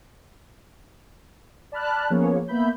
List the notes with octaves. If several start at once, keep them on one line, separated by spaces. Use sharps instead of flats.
D5 A5 B5 F6 F#6
F3 A#3 B3 C#4 G#4 C#5
A#3 B3 E5 B5 G6